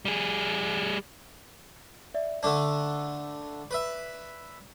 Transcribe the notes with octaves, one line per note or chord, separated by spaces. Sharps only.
G3 G#4
D5 E5
D3 A3 D4 D5 D6
B4 E5